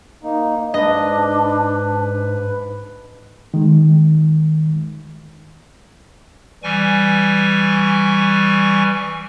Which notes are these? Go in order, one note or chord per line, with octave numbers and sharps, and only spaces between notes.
A#3 D#4
G#2 D4 B4 D#5
D#3 G#3
E3 G3 G#5 C#6